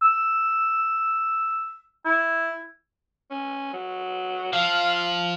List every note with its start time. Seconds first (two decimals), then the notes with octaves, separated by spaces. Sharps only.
0.03 E6
2.06 E4
3.31 C#4
3.73 F#3
4.53 F3 F5